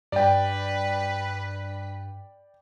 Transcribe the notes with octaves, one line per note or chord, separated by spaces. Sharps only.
G2 B4 D5 G5